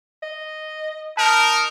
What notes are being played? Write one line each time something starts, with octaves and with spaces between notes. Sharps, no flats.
D#5
D#4 A#4 A5